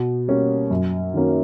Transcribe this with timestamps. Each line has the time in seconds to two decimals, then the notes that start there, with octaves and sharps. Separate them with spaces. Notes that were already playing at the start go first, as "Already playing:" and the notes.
Already playing: B2
0.28 G3 A#3 C#4
0.71 F#2
1.14 D#3 F#3 A#3 C#4